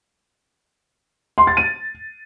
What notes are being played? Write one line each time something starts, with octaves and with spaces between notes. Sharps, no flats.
C6
A6
D#7